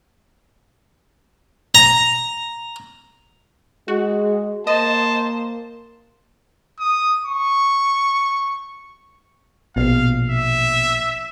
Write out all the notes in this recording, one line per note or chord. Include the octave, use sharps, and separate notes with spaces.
A#5
G#3 F#4
A#3 C5 D#5 A5
D#6
C#6
A#1 B2 F5
E5